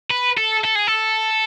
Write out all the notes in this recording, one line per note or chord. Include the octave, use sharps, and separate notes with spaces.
B4
A4
A4
G#4
A4